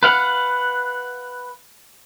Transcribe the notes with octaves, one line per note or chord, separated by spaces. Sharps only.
B4 F5 F#5